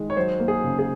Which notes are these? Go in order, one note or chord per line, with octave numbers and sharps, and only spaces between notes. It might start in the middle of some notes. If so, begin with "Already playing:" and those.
Already playing: D#3 G#3
C#5
F#3 C5
A#3
G#4
C#3
G#4